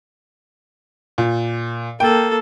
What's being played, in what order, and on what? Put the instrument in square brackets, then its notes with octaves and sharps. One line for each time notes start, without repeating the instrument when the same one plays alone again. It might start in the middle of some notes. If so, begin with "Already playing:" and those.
[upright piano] A#2
[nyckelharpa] A#3 A4 [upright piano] G5